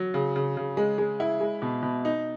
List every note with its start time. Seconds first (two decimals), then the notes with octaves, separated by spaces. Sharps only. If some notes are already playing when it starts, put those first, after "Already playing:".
Already playing: F#3
0.14 C#3
0.36 C#3
0.57 C#3
0.77 G#3
0.98 G#3
1.20 E4
1.41 G#3
1.62 B2
1.83 B2
2.05 D#4